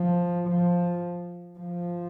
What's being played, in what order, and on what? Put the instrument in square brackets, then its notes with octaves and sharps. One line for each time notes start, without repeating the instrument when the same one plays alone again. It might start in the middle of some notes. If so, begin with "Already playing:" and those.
Already playing: [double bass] F3
F3
F3